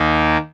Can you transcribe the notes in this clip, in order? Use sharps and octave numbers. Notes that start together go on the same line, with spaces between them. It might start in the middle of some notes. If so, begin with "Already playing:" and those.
Already playing: D#2 D#3 A#3